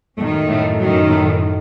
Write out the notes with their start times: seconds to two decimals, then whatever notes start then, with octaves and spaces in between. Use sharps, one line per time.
0.18 F#2 A2 D#3 A3
0.48 A2 A3
0.79 F#2 D#3 F#3
1.09 A2 A3